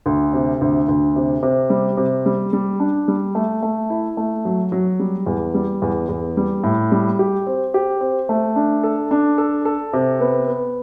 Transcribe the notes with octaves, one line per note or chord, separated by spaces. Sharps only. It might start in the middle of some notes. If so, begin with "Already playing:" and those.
D2
C3
D2
D2
C3
C3
G3
C3
G3
G3
D4
G3
A3
A3
E4
A3
F#3
F#3
G3
E2
G3
E2
E2
G3
A2
G3
G4
C4
G4
C4
A3
D4
A4
D4
A4
A4
C3
B3
B3